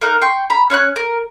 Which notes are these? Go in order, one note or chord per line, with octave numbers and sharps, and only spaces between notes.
A#3 D#4 A#4 F#6
G5 C6 C#6
A#5 B5
C#4 C#5 B5 F#6
A#4